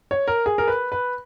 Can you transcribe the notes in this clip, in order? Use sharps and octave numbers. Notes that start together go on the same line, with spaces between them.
C#5
A#4
G#4
A#4
B4
B4